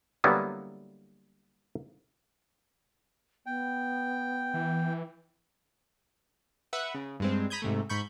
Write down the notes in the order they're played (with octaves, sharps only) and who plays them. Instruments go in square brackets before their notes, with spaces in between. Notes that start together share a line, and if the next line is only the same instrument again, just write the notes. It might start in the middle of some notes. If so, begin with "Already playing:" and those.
[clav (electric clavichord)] D3 F#3 G3 A#3 B3 E4
[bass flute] B3 [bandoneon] G5
[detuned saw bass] E3
[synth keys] B4 E5 F#5
C#3
G2 G#3 C4
A#5 B5 D#6 G6 G#6
G#2 C3 A3
G#2 B5 C#6 G6